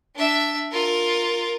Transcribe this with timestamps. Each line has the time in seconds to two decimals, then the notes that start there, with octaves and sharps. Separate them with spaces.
0.16 D4 E5
0.71 F4 A#4